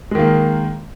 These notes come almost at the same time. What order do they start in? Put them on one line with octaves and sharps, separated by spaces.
G#3 D#3 A#3